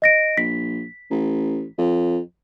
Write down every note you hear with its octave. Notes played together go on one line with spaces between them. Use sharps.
D#5 A#6 D7
A#1 B6
A1
F2